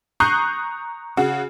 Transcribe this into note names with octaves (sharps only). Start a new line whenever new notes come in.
A#5 C#6 D#6 F#6 G6 C7
C#3 F#4